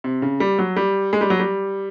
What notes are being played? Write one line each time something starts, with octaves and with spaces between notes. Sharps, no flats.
C3
C#3
G3
F#3
G3
G#3
G3
F#3
G3